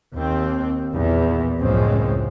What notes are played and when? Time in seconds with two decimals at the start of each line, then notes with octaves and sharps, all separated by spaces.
0.15 D#2 C4
0.93 B1 E2 A#2 E3 B3
1.59 C#2 F#2 A2 F3 G#3 C4